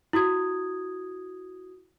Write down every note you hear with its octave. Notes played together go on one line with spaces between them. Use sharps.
E4 F#4 D#6 G#6